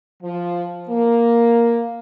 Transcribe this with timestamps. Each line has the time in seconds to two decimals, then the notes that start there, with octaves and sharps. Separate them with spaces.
0.23 F3
0.89 A#3